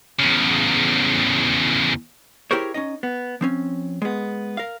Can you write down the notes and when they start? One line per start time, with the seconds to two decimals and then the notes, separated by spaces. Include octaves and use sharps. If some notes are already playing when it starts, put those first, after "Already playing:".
0.19 E2 C#3
2.51 E4 G4 G#4 A#4 C5 C#5
2.74 C#4 D#4 D#5
3.03 B3
3.41 F3 C4 C#4
4.02 G#3 B3
4.57 A#4 F5